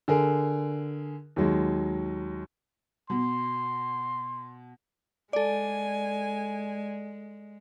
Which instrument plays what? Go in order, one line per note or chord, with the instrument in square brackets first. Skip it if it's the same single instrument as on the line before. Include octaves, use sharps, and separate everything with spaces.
[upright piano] D3 G#4 A#4
D#2 F#3 G#3
[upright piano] B2 [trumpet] C6
[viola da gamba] G#3 [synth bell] A4 D5 [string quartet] G#5